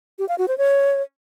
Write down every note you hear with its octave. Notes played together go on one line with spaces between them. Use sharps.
G4
F5
F#4
C5
C#5